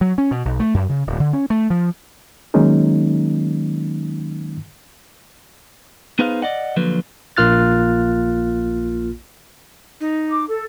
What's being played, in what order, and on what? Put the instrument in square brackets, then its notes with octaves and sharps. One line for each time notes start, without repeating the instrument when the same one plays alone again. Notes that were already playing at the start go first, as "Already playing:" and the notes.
[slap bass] F#3
C#4
B2
B1
A3
F#2
C#3
D1
D3
C#4
A3
F3
[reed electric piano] D#3 F#3 G#3 A#3 C#4 D#4
[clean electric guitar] B3 D#4 G#4 B4 C5 F5
D5 D#5 F#5
D3 F3 F#3 A#3 B4
[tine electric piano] A#1 A#3 F4 F6 F#6 A6
[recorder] D#4
[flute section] D6
A4